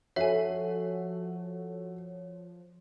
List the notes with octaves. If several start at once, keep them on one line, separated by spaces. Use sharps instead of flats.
F3 F#4 A4 C#5 E5 G#5